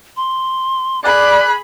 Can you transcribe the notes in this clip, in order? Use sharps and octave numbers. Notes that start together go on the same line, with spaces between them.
C6
G#4 D5 B5 F#6